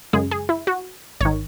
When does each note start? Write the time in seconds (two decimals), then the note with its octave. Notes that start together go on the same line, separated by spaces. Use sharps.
0.13 F#2 C#3 G#3 G#4
0.31 G#4
0.49 E4
0.67 F#4
1.20 G#1 C#5
1.25 D#3